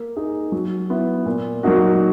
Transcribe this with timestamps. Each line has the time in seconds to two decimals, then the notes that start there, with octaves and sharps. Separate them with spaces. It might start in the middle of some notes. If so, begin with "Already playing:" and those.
Already playing: A#3
0.17 D#4 G#4
0.52 F#3
0.90 B3 E4
1.26 A#2
1.63 F#3 A#3 D#4 F#4